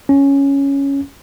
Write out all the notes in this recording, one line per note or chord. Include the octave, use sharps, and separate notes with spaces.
C#4